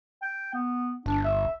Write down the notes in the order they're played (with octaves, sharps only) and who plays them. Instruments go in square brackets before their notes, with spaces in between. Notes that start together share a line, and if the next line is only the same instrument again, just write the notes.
[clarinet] G5
B3
[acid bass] G1 [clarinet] D4
[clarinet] E5